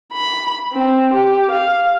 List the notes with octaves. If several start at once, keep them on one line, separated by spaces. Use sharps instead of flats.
B5
C4
G4
F5